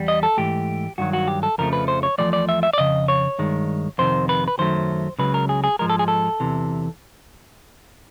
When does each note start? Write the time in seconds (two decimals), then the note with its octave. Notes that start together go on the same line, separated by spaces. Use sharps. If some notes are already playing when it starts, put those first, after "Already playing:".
Already playing: E2 G3
0.08 D#5
0.23 A4
0.37 G#2 E3 A3 G4
0.98 G2 D#3 F#3 F#4
1.13 F#4
1.28 G4
1.43 A4
1.58 F2 C#3 F3 A3 A#4
1.73 B4
1.88 C5
2.03 C#5
2.18 E2 C3 F3 A3 D5
2.33 D5
2.49 E5
2.63 E5
2.73 D5
2.78 F2 C#3 D#5
3.08 C#5
3.39 G2 D#3 G#3
3.98 F2 C3 D#3 C5
4.29 B4
4.48 B4
4.58 F#2 D#3 F#3 A3 C5
5.19 C#2 C#3 F#3 B4
5.34 A#4
5.49 G#4
5.64 G#4
5.79 G#2 F3 G#3 A#4
5.90 A4
5.99 G#4
6.08 A4
6.40 E2 C3 E3